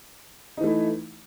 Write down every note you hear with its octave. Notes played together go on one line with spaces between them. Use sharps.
E3 A3 D#4 E4